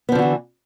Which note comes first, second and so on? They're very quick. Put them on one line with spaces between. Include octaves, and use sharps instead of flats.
B3 F3 D3 F#4 E3